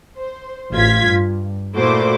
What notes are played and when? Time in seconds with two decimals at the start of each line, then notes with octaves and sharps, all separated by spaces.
0.17 C5
0.73 A1 F4 G#6 B6
1.05 G2
1.75 A#2 A3 E4 F#4 C5 D6